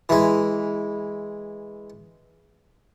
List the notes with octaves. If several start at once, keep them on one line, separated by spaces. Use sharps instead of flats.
E3 G#3